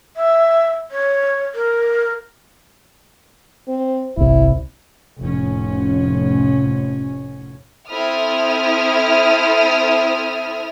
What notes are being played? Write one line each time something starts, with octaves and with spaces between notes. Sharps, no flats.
E5
C#5
A#4
C4
G1 C2 E4
F1 A2 C#4
C4 E4 A4 D#6 F6